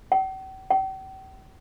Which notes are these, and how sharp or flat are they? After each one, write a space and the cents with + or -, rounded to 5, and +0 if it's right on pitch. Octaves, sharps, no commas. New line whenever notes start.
G5 -45
G5 -40